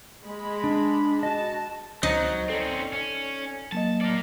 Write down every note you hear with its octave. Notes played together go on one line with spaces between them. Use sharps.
G#3 B5
D4
F#4 D#5 A5
C#2 F#3 D#4 C5 A6
C4 C#4 A4 D5
C#4
F#3 A#3 D#5 A5
A#4 D5